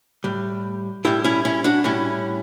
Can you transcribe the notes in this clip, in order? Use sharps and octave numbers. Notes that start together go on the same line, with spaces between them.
A2 G3
A2 G3 E4 G4
C#4 E4
C#4 E4
D4 F#4
A2 G3 C#4 E4